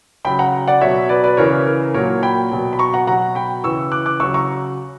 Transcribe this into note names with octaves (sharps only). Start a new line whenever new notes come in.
C#3 F#3 G5 B5
F#5 A#5
D5 F#5
B2 F#3 C#5 E5
B4 D5
B4 D5
C#3 E3 A#4 C#5
A#4
A#2 F#3 A#4 C#5
G5 B5
B2 F#3
B5
A#5 C#6
F#5 A#5
B2 F#3 F#5 A#5
G5 B5
C#3 E3 C#6 E6
D6 F#6
D6 F#6
C#3 F#3 C#6 E6
A#5 C#6